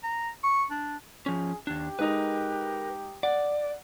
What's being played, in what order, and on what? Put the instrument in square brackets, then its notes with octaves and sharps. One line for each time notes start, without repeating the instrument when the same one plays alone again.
[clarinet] A#5
C#6
D4
[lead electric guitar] F3 C#4 [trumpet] G#4
[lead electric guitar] D#2 D4 [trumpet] G4
[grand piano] G#3 D#4 D#6 [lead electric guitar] A#4 B4
[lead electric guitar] D5 [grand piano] F#5